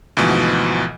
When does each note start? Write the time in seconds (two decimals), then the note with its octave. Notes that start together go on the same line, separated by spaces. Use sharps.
0.17 D2 G#2 B2 E3 F3